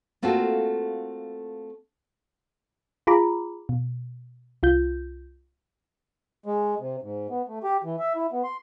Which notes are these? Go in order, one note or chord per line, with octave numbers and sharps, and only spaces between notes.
A3 A#3 C4 F4 F#4 A4
F4 G#4 A#5 B5 D6
B2
C2 F4 G6
G#3
C3
G#2
B3
A3
G4
E3
E5
E4
B3
C6